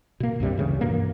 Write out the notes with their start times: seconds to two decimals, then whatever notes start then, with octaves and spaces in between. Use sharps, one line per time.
0.20 B2 A#3
0.40 C2 G2 C3 G3
0.58 D2 C#3 E3
0.81 G2 B2 E3 A#3